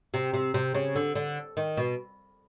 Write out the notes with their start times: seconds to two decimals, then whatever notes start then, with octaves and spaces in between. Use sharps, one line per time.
0.14 C3
0.34 C3
0.54 C3
0.74 C#3
0.96 D3
1.15 D3
1.57 D#3
1.77 B2